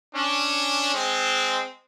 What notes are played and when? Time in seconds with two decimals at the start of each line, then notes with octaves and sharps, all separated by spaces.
0.14 C#4 D4
0.94 G#3 C4